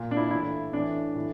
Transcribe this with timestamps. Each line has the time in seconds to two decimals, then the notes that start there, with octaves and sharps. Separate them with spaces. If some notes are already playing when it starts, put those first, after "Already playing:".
Already playing: A#2
0.11 D4
0.17 E4
0.31 A2 E3 E4
0.73 A2 E3 D4
1.15 A2 E3